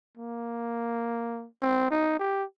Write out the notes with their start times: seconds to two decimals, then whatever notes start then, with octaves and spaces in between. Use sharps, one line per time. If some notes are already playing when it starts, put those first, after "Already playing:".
0.17 A#3
1.62 C4
1.91 D#4
2.19 G4